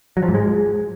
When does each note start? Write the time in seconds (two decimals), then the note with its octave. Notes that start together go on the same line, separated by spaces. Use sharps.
0.17 F#3
0.23 F3
0.29 G#2
0.34 G#3